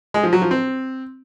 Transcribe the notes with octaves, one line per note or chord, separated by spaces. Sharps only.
G#3
F3
F#3
F3
C4